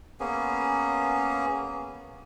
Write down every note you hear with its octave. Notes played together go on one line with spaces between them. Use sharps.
A#3 B3 C#4 G#4